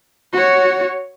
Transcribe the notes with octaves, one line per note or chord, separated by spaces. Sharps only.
F#4 C#5